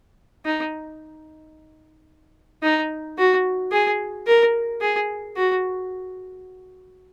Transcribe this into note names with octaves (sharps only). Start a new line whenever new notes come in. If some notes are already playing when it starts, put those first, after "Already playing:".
D#4
D#4
F#4
G#4
A#4
G#4
F#4